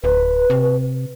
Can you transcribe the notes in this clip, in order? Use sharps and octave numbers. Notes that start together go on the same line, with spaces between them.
D1 B4
C3